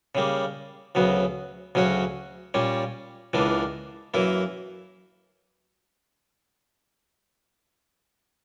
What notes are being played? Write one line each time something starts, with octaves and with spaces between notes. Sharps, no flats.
C#3 G3 A#3
D2 C#3 F#3 B3
D2 C#3 F#3 C#4 F#4
A#2 G3 C#4
C#2 C#3 E3 A#3 D4
F#2 E3 A#3 E4